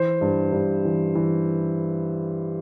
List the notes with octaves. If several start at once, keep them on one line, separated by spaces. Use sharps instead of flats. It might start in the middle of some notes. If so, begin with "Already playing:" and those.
Already playing: E3 C5
G2
G2
E3
E3